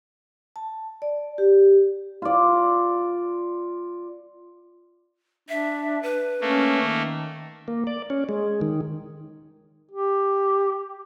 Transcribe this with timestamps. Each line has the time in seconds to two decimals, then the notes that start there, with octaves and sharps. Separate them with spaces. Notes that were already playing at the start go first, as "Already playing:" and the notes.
0.56 A5
1.02 D5
1.38 G4
2.22 F4 D5
5.49 D4 E5
6.03 B4
6.41 A3 A#3 C#4
6.82 D#3
7.68 A#3
7.87 D5
8.10 C#4
8.29 G#3
8.61 D#3
9.91 G4